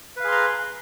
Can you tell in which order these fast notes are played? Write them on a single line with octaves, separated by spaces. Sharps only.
B4 F5 G#4 C6 A#5